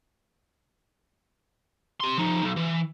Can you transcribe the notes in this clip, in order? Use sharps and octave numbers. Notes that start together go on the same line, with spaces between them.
G4 C6
F3 D#4
B1
E3